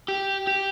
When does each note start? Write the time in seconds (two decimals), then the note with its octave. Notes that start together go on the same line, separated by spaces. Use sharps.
0.08 G4
0.47 G4